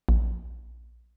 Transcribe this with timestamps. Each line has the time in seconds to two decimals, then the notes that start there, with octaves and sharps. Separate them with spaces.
0.09 A#1